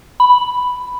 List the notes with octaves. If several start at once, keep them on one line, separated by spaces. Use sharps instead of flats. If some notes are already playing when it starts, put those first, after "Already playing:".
B5